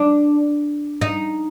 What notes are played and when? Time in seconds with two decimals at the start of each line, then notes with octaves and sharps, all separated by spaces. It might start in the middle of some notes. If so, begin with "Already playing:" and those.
Already playing: D4
1.01 D#4